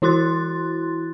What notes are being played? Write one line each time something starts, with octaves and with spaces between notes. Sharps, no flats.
E3 E4 F#4 C6 F#6 A6